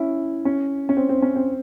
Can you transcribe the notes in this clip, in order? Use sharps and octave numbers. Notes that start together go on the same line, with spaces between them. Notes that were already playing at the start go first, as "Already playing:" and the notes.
Already playing: C#4 E4
C#4
C#4
C4
C4
C#4
C4